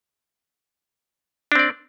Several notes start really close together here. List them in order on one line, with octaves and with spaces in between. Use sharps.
D4 C4 D5